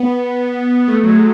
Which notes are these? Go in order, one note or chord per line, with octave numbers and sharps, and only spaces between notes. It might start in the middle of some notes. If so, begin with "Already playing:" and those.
Already playing: B3
A3
F#3
G#3